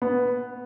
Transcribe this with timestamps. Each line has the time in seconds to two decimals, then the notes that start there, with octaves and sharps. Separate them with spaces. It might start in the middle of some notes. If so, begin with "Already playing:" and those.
0.02 B3